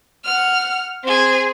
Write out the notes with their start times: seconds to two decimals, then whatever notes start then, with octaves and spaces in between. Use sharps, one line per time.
0.25 F#5 F6
1.04 C4 G#4